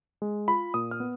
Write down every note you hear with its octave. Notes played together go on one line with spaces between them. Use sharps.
G#3
F4 B5
A#2 D#6
F6
B3